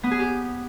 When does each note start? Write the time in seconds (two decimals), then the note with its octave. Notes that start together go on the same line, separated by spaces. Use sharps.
0.03 B3
0.11 G#4
0.19 G4